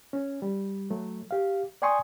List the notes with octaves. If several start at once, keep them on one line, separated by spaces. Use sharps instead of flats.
C#4
G3
F#3 A3
G4 F5
D5 G5 G#5 C6 C#6 D#6